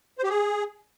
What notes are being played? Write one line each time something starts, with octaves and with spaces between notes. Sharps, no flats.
C5
G4
G#4